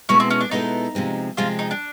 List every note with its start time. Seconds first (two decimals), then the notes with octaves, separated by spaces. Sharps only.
0.09 B2 G#3 B3 C#4 E4 A4
0.20 C4
0.30 C#4
0.41 D4
0.51 B2 G#3 B3 D#4 E4 A4
0.95 C3 F3 G#3 C4
1.37 C3 F3 G#3 C4 F4
1.59 D#4
1.71 D4